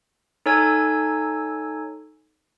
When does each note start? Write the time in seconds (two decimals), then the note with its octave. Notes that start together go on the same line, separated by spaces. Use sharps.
0.46 D#4 A4 C#5 G#5 E6 G#6